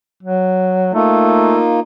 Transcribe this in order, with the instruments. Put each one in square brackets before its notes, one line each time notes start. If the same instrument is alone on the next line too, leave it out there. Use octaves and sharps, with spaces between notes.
[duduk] F#3
[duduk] A3 [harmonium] A#3 D#4 F4